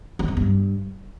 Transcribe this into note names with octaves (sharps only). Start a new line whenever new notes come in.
D3
E2
G2